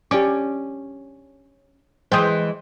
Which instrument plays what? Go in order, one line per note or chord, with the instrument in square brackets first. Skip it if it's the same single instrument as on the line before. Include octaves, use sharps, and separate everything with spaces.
[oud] C#4 [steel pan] G4 D5 D6
[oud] E3 G#3 [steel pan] C5 G5 D#6